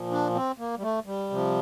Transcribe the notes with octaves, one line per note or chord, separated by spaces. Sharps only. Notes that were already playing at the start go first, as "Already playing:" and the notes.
Already playing: A#2 F3
D4
C4
A#3
G3
A3
G3
C3 F3